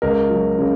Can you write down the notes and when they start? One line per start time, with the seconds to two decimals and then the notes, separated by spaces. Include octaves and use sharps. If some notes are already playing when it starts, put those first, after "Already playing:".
0.02 C#2 A#4
0.30 F#3
0.59 C#3